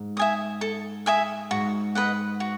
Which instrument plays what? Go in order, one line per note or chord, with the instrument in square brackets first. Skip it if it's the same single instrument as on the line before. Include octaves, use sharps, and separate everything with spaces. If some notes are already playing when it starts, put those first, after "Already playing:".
Already playing: [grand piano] G#2
[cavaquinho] E5 G#5 D#6
A4
E5 G#5 D#6
[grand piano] G#2 [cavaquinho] F#4
[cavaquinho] B4 D#5 F#5
F#4